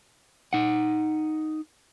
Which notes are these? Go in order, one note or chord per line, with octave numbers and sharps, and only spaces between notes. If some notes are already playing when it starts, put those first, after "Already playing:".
D#4 F#5